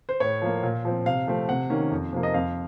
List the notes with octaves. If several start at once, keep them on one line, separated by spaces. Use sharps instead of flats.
C5
A2 C#5
F3 A#3
A#2
F3 C4
C3 F5
F3 A3 C4
C3 F#5
D#3 A#3 C#4
F2
C3 F3 A#3
D#5
F2 F5